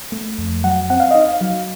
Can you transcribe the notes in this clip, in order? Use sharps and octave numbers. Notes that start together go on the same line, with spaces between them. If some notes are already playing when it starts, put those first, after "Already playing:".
A3
F2
F#3 F#5
C4 F#5
F5
D#4 D#5
F5
F#3